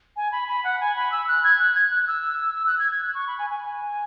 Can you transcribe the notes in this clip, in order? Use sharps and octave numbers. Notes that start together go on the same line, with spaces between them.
G#5
B5
B5
F#5
G#5
B5
E6
F#6
G#6
F#6
G#6
F#6
E6
E6
F#6
G#6
G#6
F#6
C#6
B5
G#5
G#5